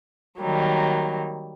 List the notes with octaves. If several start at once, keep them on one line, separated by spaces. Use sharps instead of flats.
D#3 F#3 G3 A#3